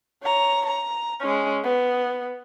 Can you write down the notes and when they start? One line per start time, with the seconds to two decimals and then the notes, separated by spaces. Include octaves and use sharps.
0.23 C#5 A#5
0.66 A#5
1.21 G#3 C#4
1.64 B3